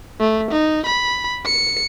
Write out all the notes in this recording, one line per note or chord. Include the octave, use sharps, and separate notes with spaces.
A3
D#4
B5
C#7